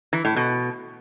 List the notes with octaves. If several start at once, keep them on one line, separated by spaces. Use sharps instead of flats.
E3
A2
B2